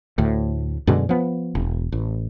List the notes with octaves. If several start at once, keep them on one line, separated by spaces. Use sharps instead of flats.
D2 A2
F#2 B2 D3 G#3
F3 B3
E1
A1